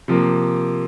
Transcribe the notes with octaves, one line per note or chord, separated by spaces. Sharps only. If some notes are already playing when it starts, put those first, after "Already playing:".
C3 F3 A#3